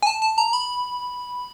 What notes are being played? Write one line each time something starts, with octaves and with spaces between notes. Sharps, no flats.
G#5
A5
A5
A#5
B5